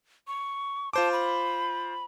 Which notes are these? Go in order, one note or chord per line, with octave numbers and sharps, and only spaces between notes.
C#6
F4 C5 A5 D6
B5